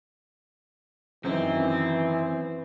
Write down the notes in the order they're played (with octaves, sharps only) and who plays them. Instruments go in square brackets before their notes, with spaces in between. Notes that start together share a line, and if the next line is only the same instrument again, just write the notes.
[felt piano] F#2 D#3 [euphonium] E3 [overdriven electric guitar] C4